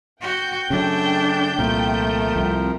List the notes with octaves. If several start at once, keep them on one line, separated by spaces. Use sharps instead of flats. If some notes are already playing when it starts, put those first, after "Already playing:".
F#4 G5 G6
F#2 C#3 F#3 A3 D4
C2 A#2 F3 A3 A#4
C2 F2